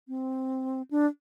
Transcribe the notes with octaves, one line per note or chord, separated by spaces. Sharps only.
C4
D4